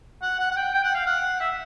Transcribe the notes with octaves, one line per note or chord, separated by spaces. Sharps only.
F#5
F#5
F#5
G5
G5
F#5
F5
F#5
E5